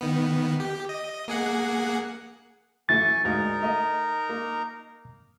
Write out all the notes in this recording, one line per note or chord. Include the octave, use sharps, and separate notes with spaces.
D#3 B3
G4
D#5
A#3 G#4 F#5
F#2 E3 A3 G#5 C#6 A6
D2 G#2 D#4 A#4 A#5
A3 D#5
A#3